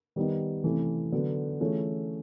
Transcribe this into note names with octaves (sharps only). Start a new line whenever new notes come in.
D#3 G3 B3 D#4
C3 E3 A3 C#4
D3 F#3 B3
E3 A3 C#4 F4 G#4